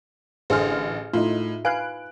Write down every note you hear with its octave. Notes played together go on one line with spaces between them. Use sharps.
A1 D3 G#4 C5 F6
A2 D#4 F4
B4 F5 G#5 F#6 D7